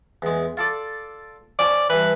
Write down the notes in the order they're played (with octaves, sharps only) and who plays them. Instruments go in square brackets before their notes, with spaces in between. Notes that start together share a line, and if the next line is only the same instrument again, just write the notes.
[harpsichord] E2 G#3
F4 A4 D5
[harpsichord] F3 C#4 G5 [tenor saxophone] D5
[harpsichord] G2 E3 [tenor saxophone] B4